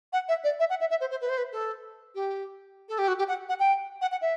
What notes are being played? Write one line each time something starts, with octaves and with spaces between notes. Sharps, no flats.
F#5
E5
D5
E5
F#5
E5
E5
C5
C5
B4
C5
B4
A4
G4
A4
G4
F#4
G4
F#5
F#5
G5
F#5
F#5
E5